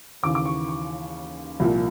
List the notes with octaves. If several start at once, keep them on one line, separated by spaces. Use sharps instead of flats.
D#2 C#3 E3 D6
D6
C#6
C#6
C2 A#2 F3